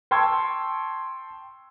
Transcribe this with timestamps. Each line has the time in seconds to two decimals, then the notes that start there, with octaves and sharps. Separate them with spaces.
0.11 G5 A5 C6 C#6 E6 G#6